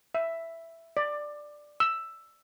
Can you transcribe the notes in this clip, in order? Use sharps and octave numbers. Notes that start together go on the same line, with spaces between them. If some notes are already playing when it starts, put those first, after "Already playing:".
E5
D5
E6